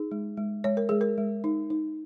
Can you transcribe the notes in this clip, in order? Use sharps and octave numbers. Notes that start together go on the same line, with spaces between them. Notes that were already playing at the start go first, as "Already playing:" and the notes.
Already playing: D#4 G#4
G#3
G#3
G#3 C#5
A#4
G#3 G#4
A#4
G#3
D#4
D#4